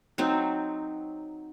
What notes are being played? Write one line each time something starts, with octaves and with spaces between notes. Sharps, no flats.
F#3 C4 D#4